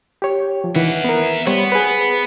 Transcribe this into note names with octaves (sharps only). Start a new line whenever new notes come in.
G4 C#5
F3
D#3 E3 E5 F#5
B3 A#4
G3 B3 C5 C#5
G#4 B4